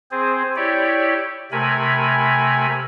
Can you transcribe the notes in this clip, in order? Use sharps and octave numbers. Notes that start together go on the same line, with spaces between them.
C4 G#4 C5
E4 G4 C#5 D5
C3 A3 A#4 G#5 B5